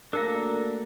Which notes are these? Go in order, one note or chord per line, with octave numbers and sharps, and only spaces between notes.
A3 A#3 D4 F#4 A4 A#4 F5 A#5